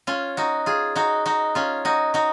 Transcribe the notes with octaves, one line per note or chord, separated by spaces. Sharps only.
C#4 F4
D#4 F#4
F4 G#4
D#4 F#4
D#4 F#4
C#4 F4
D#4 F#4
D#4 F#4